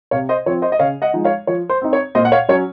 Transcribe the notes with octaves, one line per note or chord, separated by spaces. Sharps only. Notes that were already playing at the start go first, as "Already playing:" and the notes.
C3 C#5 F5
C5 D#5
F3 C4 C#5
C5 D#5
D#5
C#3 C#5 F5
D#5 F#5
F3 G#3 D#4
C#5 F5
F3 C#5
C5
C4 D#4
C#5
A#2 C5 D#5
F#5
C#5 F5
F#3 C#4 C#5